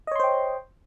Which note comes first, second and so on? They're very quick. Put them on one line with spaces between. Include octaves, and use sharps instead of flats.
D#5 C#5 C6 C5 G5